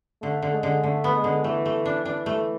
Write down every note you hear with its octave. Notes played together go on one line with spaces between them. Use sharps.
D3 A3
D3
G#3
D3
D3 A3
B3
G#3
D3
E3 A3
A3
D4
E3 D4
A3